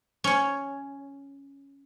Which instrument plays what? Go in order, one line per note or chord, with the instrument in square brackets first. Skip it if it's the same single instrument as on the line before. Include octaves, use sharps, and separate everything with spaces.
[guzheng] C#4 C#5